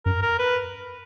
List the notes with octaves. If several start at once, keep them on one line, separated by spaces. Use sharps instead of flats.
F#2 A#4
A#4
B4